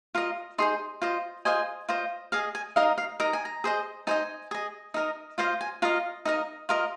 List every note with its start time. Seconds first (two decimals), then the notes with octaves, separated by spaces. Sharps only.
0.15 F4 A#4 D#5
0.58 D#4 G#4 C5 C6
1.02 F4 C5 D#5
1.45 F4 G#4 C5 D#5 G#5
1.89 F4 C5 D#5
2.32 G#4 D#5 F5
2.55 G#5
2.76 D#4 A#4 D#5 F5
2.98 F5
3.20 D#4 A#4 D#5 A#5
3.33 G#5
3.45 A#5
3.64 G#4 C5 D#5
4.07 D#4 C5 D#5 G#5
4.51 G#4 D#5
4.94 D#4 A#4 D#5
5.38 F4 C5 D#5 F5
5.61 G#5
5.82 F4 A#4 D#5 F5
6.25 D#4 A#4 D#5
6.69 F4 A#4 D#5